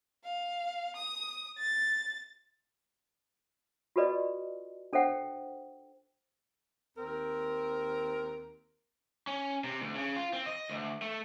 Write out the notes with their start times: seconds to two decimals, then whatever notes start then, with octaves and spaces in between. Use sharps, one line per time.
0.24 F5
0.97 D#6
1.57 A6
3.96 F4 F#4 A4 B4 D5 D#5
4.93 D4 A4 C5 E5 F#5 G5
6.98 D#2 C4 A#4
9.27 C#4
9.64 C3
9.81 D2
9.95 C#3
10.16 F4
10.33 C4
10.46 D#5
10.70 D2
11.02 A3